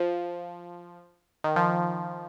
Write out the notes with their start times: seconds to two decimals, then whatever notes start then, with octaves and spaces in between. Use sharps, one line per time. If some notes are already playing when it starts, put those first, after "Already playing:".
Already playing: F3
1.44 D#3
1.56 F3